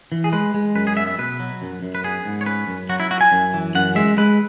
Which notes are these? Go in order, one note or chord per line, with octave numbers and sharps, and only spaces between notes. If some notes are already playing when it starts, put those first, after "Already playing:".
E3
G#4
G#3 B4
G#3
F#2 B4
G#4
B3 E5
E5
B2 B4
F#3
F#2
F#2
B4
B3 G#4
G#2
C#5
C#4 B4
F#2
F#3 F#4
E4
E4 F#4
G#5
F#2
E3
F#2 F#5
G#3 E5
G#3 B4